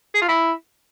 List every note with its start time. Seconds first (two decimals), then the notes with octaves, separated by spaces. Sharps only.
0.15 G#4
0.21 F4
0.28 E4